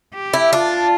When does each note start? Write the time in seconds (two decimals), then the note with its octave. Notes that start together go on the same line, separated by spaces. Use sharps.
0.14 G4
0.33 E4
0.53 D4 F4